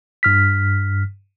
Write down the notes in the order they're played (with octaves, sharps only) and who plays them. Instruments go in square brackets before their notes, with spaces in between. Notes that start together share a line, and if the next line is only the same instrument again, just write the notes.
[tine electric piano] G2 F6 B6